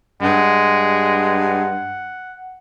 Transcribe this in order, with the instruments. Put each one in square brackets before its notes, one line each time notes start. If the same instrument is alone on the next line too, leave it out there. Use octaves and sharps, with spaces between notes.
[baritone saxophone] G2 [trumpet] G#3 [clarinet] F#5